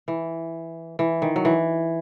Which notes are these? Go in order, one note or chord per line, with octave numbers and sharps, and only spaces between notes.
E3
E3
D#3
F#3
E3